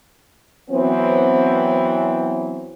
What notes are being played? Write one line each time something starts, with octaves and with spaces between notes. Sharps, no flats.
E3 F#3 B3 C4